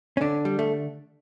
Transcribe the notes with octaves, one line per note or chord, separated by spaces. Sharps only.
C#4
D3 D4
G3
A3